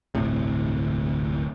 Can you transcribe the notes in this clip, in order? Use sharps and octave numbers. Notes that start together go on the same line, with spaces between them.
D1 G1 A2 C3